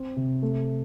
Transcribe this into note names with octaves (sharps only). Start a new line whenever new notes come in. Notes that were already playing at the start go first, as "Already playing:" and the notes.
Already playing: C4
C3
A3